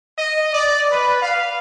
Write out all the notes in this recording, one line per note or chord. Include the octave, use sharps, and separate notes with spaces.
D#5
D5
B4
F5